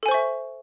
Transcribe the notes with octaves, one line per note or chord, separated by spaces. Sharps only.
A4 C5 E5 G#5 C#6